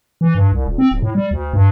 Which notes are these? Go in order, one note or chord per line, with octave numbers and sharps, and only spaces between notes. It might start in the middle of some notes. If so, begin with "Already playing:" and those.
E3
G2
C2
D#1
C4
D1
A2
G3
D2
G2